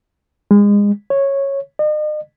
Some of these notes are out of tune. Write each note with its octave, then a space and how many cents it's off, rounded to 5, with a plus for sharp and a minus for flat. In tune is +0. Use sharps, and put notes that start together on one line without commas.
G#3 -30
C#5 -10
D#5 -40